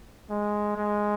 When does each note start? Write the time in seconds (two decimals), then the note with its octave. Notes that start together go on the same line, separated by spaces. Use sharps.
0.30 G#3
0.76 G#3